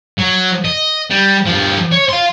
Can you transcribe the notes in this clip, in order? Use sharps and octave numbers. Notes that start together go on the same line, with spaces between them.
F#3
D#5
G3
G2 F3
C#5
F5 C6